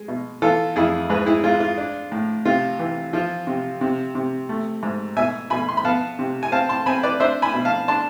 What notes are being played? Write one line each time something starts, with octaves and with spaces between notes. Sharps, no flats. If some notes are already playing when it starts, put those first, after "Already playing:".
Already playing: G#3
B2
E3 F4 A4
F2 E4 G#4
G#2 G#4 B4
E4 G#4
G#3 F4
F4
D4
A2
C3 F4
E3
F3 F4
C3
C3
C3
A3
G#2
B2 E5 G#5
B2 G#5 B5
C6
B5
B3 F5 A5
C3
G#5
C4 F5 A5
A5 C6
C4 G#5 B5
B4 D5
D4 C5 E5
G#5 B5
B2
F5 A5
D4 A5 C6